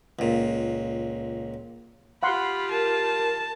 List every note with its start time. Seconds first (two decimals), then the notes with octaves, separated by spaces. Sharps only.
0.19 C#2 A#2
2.23 F4 G4 F5 F#5 B5 C6
2.70 A#4 A5